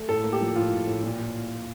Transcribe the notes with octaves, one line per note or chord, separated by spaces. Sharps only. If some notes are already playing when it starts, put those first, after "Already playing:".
Already playing: A3
A2 A4
A#3
G4
F3
A2 F4
A2
A2
A#2